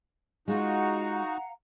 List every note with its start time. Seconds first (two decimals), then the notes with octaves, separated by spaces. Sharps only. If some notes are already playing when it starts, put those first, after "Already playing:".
0.48 G#3 D#4 F4 F#4 F5 F#5 A#5